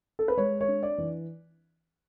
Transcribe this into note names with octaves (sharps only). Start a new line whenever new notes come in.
A4
B4
G#3 C#5
C#5
D4
D5
E3